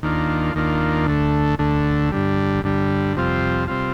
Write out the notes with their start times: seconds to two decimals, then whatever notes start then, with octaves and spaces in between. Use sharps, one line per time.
0.03 D#2 D#3 A#3 D4 F4
0.55 D#2 D#3 A#3 D4 F4
1.07 D2 D3 A3
1.59 D2 D3 A3
2.11 G2 D3 G3
2.63 G2 D3 G3
3.16 F2 C3 G3 C4 F4
3.68 C3 G3 C4 F4